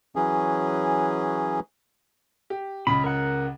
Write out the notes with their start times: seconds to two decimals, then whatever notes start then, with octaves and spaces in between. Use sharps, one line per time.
0.16 E3 F#3 C#4 G#4
2.50 G4
2.87 C#2 C#3 B5
3.04 A#4 F#5